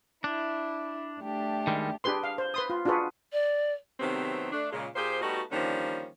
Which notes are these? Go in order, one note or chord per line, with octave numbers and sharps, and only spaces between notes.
D4 E4
A3 D4 G4
D#3 G3 G#3
D4 G4 G#4 B4 C6
F5
C5
B4 C6 D#6
F4
D4 F4 F#4 G#4 B4
D5
C3 D#3 F#3 A3 B3 C4
A3 D4
A#2 C#3 G#3
A#2 G4 G#4 C5
G3 A3 B3 D#4 F#4
D3 D#3 F3 G3 A#3 C#4